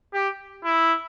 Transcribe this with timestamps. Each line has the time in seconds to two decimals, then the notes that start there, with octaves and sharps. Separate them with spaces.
0.14 G4
0.65 E4